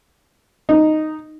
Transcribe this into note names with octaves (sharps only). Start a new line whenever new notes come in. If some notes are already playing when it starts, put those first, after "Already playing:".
D#4